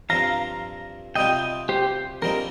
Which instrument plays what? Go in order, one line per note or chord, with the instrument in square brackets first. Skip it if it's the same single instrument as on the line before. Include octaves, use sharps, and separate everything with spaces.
[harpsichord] G2 F3 C4 [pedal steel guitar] F5 A#5
[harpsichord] C3 G3 C4 F4 [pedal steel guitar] D#5 G5
[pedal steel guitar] G4 C5
[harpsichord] A#1 A#2 G3 C4 D#4 [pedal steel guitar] A#4